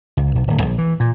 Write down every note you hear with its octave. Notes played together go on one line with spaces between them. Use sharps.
C#2
B1
D1
A#1
E3
A#2